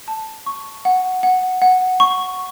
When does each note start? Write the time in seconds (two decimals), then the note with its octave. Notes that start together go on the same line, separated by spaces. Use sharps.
0.08 A5
0.46 C#6
0.85 F#5
1.23 F#5
1.62 F#5
2.00 C#6